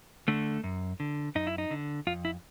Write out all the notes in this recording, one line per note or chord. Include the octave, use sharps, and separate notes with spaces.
D3 A3
F#2
D3
F#2 D#4
E4
D#4
D3
F2 F4
E4